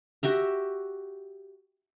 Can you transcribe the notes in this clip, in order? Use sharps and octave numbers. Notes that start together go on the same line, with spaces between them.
F#4 G4 E5 A#5